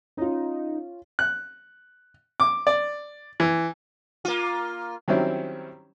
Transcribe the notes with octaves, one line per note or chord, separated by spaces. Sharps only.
C#4 D#4 F4
F#6
D6
D5
E3
A#3 F4
D#3 F#3 G3 C4 C#4 E4